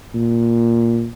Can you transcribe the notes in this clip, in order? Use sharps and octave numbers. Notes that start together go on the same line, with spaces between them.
A#2